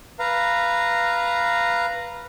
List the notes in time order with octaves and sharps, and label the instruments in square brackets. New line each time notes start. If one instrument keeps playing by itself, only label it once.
[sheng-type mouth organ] B4 F5 A#5